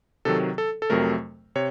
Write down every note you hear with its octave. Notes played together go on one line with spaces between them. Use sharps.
C3 D#3 F#3 A4
A4
A4
F2 C3 F#3 A3 A#4
C3 C#5